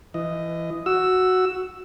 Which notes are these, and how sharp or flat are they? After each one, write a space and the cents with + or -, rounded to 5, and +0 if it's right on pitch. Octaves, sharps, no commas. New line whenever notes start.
E3 +25 D#5 +0
F#4 +0 E6 +0